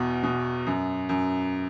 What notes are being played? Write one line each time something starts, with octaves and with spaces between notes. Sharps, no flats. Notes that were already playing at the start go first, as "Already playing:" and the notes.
Already playing: E2 B2
B2
F#2
F#2